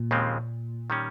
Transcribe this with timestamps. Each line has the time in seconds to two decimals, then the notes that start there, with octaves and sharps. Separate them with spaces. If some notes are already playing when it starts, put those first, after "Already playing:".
Already playing: A#2
0.11 D#2 C#3 F3 G#3 C4
0.90 D#3 G3 C#4